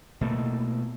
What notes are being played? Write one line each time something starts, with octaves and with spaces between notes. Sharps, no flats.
B2 A3 A#3